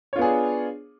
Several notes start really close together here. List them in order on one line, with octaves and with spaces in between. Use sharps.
C#5 F4 B3 G#4 D4